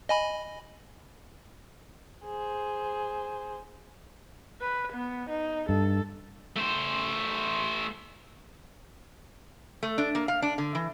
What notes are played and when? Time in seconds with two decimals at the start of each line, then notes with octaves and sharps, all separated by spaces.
0.09 D#5 G#5 B5
2.25 G#4 C5
4.61 B4
4.92 B3
5.29 D#4
5.69 G2 A4
6.56 A3 C5
9.83 A3
9.98 D4
10.15 A#3
10.28 F5
10.42 D4
10.58 D3
10.75 E3